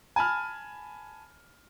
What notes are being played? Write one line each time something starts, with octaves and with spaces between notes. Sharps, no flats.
G#5 A5 B5 F6